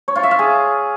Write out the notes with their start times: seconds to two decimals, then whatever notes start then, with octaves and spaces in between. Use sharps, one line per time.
0.08 C#5
0.16 F4
0.23 E5
0.31 F5
0.39 G#4